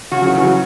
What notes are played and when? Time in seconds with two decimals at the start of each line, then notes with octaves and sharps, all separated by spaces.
0.11 C#3 F#4
0.22 F#3
0.27 E3
0.35 C#3
0.43 F#3